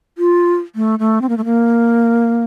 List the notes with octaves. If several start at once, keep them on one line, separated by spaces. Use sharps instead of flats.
F4
A3
A3
C4
A#3
A3
A#3